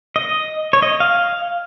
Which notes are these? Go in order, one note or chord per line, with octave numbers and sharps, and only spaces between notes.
D#5
C#5
D#5
F5